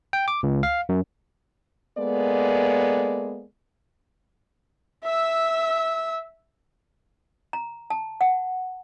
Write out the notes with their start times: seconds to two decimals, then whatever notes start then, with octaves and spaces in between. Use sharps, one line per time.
0.13 G5
0.28 D6
0.43 C#2
0.63 F5
0.89 F#2
1.97 G#3 A#3 B3 A4 D5
5.04 E5 E6
7.53 A#5
7.90 A5
8.21 F#5